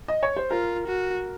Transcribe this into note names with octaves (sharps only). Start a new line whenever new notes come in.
D#5
C#5
C5
F4 A#4
F#4